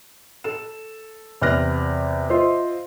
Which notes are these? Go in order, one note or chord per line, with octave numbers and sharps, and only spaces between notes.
A4 E7
E2 C3 F6 F#6 A#6
F4 C5 D#5 E5